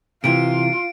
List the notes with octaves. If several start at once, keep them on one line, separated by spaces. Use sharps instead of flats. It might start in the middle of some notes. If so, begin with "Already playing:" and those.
C3 E3 F4 D7